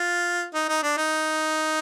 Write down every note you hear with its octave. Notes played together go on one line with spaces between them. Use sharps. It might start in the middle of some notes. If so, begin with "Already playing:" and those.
Already playing: F4
D#4
D#4
D4
D#4